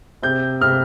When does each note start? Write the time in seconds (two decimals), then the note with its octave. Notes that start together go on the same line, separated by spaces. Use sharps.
0.23 C3 G6
0.61 C3 F6